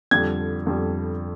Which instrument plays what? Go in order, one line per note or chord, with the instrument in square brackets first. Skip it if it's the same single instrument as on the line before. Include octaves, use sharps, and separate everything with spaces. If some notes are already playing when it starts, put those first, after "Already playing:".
[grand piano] F2 D3 G3 G#6
F2 D3 G3